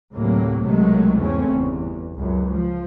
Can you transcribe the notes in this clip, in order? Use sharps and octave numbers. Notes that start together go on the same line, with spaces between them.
D2 A2 C3 F#3 A#3
B1 C3 D#3 F#3 G#3 A3
E2 G#2 C#3 A3 C4 C#4
G1 E2
C#2 F#2
F3